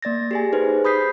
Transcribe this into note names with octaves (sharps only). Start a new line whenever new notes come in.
A#3 D5 A6 A#6
G4 G#4 G#5
D#4 G#4 B4 C5
B5 D#6 G6 B6 C7